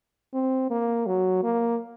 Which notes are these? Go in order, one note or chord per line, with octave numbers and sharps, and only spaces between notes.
C4
A#3
F#3
A#3